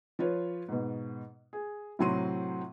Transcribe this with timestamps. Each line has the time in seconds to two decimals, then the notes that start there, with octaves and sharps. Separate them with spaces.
0.19 F3 F4 B4 C#5
0.68 G#2 B2
1.53 G#4
1.99 A2 C3 F#3 C4 C6 D#7